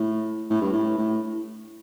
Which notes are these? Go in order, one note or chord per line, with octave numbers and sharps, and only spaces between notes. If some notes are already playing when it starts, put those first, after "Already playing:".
Already playing: A2
A2
G2
A2
A2